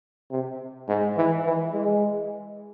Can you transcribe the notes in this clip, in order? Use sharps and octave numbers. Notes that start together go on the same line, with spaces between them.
C3
G#2
E3
E3
G#3